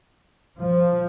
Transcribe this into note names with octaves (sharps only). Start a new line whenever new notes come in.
F3